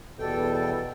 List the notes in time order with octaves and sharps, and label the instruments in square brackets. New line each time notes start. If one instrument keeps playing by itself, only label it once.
[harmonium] E2 G3 G5 [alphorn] B2 [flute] A4